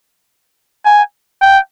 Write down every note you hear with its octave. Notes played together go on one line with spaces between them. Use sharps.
G#5
G5